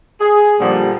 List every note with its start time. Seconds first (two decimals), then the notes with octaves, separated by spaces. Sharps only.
0.21 G#4
0.59 A#2 D3 F3 G3